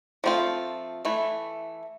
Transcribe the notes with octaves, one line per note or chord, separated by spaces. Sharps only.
F3 A3 C4 F4
E3 A3 E4